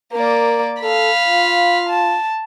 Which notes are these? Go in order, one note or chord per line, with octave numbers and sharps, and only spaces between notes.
A#3 A#4 D5
A4 F5 B5
F4
A5